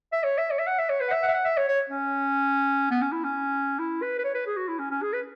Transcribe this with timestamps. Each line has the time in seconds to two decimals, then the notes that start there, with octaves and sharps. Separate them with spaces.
0.13 E5
0.24 C#5
0.38 E5
0.51 C#5
0.59 E5
0.67 F#5
0.79 E5
0.90 C#5
1.00 B4
1.08 F#5
1.12 E5
1.23 F#5
1.28 E5
1.34 F#5
1.45 E5
1.57 C#5
1.68 C#5
1.89 C#4
2.91 B3
3.02 C#4
3.12 E4
3.24 C#4
3.79 E4
4.02 B4
4.19 B4
4.24 C#5
4.34 B4
4.46 G#4
4.57 F#4
4.68 E4
4.79 C#4
4.91 C#4
5.02 G#4
5.13 B4